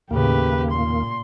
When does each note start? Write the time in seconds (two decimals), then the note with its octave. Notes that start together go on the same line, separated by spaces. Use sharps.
0.11 D#2 A2 C#3 A3 A#3 G4 B4
0.71 A#2 C6